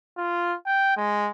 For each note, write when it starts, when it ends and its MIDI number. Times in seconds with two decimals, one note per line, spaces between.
0.17 0.55 65
0.66 0.93 79
0.97 1.30 56